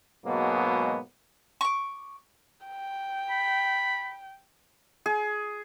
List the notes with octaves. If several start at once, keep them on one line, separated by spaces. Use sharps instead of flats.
G#2 B2 F#3 G#3 A#3 B3
C#6 D6
G5
B5
G#4